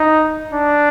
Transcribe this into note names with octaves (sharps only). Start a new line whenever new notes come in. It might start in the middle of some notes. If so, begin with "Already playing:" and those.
Already playing: D#4
D4